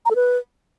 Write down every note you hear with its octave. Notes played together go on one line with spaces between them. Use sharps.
A#5
A4
B4